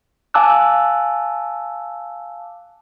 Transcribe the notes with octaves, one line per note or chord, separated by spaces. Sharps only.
F5 G#5 A5 D6 E6 F#6